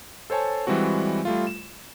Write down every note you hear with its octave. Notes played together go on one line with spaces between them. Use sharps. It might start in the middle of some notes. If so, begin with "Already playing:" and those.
A4 C5 C#5 G#5 A5
E3 G3 G#3 C4 F#4
G3 A3 F4
E7